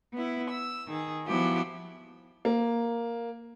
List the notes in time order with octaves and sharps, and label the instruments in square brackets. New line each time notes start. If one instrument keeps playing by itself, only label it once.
[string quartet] B3 E4
E6
D#3 G#4
F3 F#3 B3 E4 G4
[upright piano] A#3